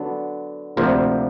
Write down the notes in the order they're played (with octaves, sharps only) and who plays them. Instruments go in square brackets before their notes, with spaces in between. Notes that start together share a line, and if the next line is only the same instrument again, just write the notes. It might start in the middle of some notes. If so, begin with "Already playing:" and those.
Already playing: [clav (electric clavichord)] D3 F#3 B3 D4
D2 C3 F3 A#3